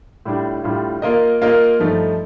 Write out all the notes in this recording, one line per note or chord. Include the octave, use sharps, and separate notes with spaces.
A2 G3 D4 F4
A2 G3 D4 F4
A#3 F4 A#4 D#5
A#3 F4 A#4 D#5
G2 F3 A3 D#4